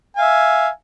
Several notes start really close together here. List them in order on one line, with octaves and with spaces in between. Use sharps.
G#5 F5 E5